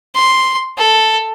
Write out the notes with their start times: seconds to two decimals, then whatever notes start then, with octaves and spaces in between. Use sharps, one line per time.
0.15 C6
0.78 A4